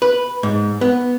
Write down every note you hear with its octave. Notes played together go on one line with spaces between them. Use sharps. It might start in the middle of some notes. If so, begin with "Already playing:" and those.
B4
G#2
B3